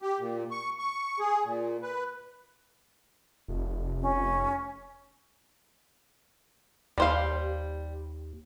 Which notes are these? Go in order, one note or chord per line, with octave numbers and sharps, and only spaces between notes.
G4
A#2
C#6
C#6
G#4
A#2
B4
F1
C#4
D#2 G3 C5 F5